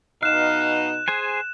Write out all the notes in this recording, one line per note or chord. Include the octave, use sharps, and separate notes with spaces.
B2 D#4 F5 F#6 E7
G#4 C5 G#5